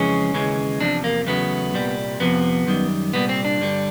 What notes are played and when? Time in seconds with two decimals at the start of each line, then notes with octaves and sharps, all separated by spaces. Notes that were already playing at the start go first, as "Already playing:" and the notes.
Already playing: F2 C#3 E3 G#3 C#4
0.34 D#2 C#3 E3 G#3
0.80 E2 C3 F3 D4
1.04 A#3
1.26 E2 C#3 F#3 A3 B3
1.74 C2 A#2 G3
2.20 F2 C3 F3 B3
2.67 F#2 D#3 G3
3.13 C2 A#2 G3 B3
3.29 C4
3.45 D4
3.61 G2 D3 G3